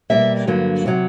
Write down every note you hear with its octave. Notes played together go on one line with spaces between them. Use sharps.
B2 G3 A#3 E5
G2 D3 F#3 A#3
C3 D#3 F#3